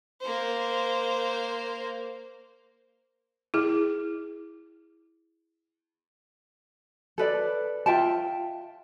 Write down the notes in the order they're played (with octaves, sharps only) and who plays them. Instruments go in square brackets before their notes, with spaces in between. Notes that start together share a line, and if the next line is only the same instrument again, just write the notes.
[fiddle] A#3 C5
[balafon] E4 G#4
[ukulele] A4 B4 D5
F4 E5 G5 A5